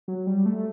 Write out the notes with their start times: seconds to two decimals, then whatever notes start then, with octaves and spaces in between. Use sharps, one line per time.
0.08 F#3
0.27 G3
0.46 A3